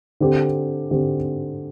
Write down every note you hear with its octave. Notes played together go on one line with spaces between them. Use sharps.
D3 C4 G4
D3 C4 G4